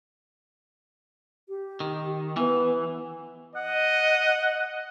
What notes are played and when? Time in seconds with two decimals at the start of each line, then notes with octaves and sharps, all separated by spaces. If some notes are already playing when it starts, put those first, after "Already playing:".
1.49 G4
1.80 D#3
2.37 E3 B3
3.56 D#5 F#5